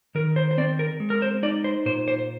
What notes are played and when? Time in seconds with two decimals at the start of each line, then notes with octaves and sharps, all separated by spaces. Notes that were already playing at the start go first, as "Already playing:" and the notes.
0.15 D#3 A#4
0.36 C5
0.51 C5
0.58 C4 D5
0.79 A#4
1.00 G#3
1.10 A#4
1.22 C5
1.43 D#4 D5
1.64 C5
1.86 A#2 C5
2.08 C5